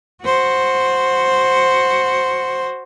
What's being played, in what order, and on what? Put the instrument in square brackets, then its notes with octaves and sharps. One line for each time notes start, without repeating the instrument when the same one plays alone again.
[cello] F#4 C5